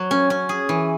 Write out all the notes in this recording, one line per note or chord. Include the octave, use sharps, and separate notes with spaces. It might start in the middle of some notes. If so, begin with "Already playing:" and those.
Already playing: F#3
C#4
C#4
G#4
E3